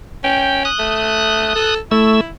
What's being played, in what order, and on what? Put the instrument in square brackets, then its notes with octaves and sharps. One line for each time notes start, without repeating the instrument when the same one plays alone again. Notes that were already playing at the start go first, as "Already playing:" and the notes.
[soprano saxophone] C#4 [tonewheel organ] G5
[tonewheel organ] D#6 F#6
[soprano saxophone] A3
A4
[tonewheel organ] A3 E6 [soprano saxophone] E4